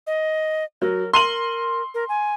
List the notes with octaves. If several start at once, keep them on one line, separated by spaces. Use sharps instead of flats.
D#5
F#3 A#4
A#4 C6 D#7 F#7
A#4
G#5